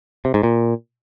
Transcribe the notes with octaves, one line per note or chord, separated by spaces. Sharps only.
C3
G#2
A#2